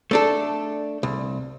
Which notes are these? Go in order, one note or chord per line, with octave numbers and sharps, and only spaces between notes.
A3 D4 A4
C2